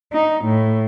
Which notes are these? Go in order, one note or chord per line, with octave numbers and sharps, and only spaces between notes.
D#4
A2